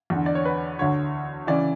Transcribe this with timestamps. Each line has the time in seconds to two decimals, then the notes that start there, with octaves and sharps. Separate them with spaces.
0.10 E2 D3
0.26 D5
0.35 C#5
0.45 B4
0.79 D2 D3 C#5
1.47 C#3 E3 D5